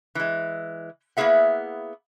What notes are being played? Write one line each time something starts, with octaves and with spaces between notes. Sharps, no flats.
E3 G#3
A#3 B3 E4 G#4 E5 F#5